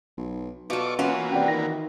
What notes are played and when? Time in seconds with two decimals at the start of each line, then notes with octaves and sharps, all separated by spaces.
0.17 B1
0.70 B2 F4 A4 D5 C#6 D6
0.99 E3 A#3 B3 C#4 F4 F#4
1.32 C3 D5 F#5 G5
1.48 D#3 A#6